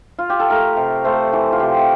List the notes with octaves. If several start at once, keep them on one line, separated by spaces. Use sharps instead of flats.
F4
G4
A4
A3 A#4
C3
A3 C5
E3
F4
C3 G4